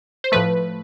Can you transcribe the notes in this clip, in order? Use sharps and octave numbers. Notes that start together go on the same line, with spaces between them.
C5
A2 F3 A3 B4